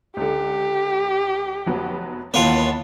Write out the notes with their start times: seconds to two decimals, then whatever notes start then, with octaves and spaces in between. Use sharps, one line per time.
0.17 C#2 D3 G4
1.66 F1 F#3 B3
2.34 D#2 E3 B3 F4 C#5 A5